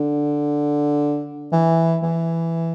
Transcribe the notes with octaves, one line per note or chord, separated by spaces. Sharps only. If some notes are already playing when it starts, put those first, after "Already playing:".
Already playing: D3
E3
E3